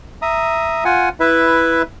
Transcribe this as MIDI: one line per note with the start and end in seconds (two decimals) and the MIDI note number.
0.22 0.84 76
0.22 0.84 82
0.22 0.84 87
0.85 1.09 65
0.85 1.09 78
0.85 1.09 80
1.20 1.82 64
1.20 1.82 71
1.20 1.82 76